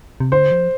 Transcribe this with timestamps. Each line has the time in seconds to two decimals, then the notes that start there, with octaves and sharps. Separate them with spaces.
0.20 C3
0.32 D3 C5
0.51 F3